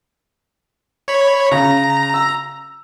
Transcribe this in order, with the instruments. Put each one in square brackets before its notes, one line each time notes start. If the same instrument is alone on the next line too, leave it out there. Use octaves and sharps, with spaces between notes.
[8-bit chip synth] C#5 B5
[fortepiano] C#3 [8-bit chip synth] A#5
[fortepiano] E6